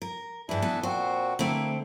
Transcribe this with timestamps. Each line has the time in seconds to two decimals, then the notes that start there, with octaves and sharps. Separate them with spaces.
0.02 A#4
0.49 G2 E3 D4 E4 G#4
0.62 B3 F#4 A4
0.83 A#2 C4 F#4 C5
1.39 D3 A3 A#3 C4 E4